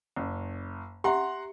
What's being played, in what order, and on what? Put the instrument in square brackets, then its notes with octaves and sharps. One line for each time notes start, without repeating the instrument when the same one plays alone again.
[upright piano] F#1
[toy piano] G4 E5 [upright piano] F#5 A#5 C6